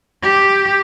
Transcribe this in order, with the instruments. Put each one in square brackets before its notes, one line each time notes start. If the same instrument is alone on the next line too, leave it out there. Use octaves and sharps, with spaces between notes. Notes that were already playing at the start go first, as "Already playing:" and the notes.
[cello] G4